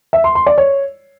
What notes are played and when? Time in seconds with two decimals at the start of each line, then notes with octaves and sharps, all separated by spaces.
0.13 E5
0.24 C6
0.35 C6
0.47 D5
0.58 C#5